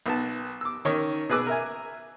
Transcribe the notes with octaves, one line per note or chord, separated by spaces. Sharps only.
B1 B3 A5
D6 E6
D#3 C#4 C#5
B2 G#4 B4 D6 E6 F#6
A#4 E5 G#5